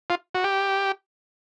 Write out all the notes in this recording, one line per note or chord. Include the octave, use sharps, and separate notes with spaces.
F4
F#4
G4